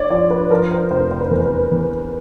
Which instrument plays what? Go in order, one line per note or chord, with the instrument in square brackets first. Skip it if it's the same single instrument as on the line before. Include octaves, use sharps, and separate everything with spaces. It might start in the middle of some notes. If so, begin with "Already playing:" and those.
Already playing: [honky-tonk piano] C#5 D5
[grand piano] F3 [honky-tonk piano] D5
[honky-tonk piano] B4
[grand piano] F3 [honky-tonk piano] A#4
[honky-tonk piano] C5
[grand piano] F1 [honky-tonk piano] C5
[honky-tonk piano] C5
B4
[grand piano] E2 [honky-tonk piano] A#4
[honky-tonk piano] B4
[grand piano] E2